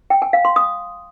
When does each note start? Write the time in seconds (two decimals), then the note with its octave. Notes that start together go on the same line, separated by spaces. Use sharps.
0.10 G5
0.22 G#5
0.33 F5
0.45 C6
0.56 D#6